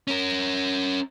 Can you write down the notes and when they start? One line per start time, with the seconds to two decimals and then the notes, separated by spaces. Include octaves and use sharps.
0.07 C#4 A#4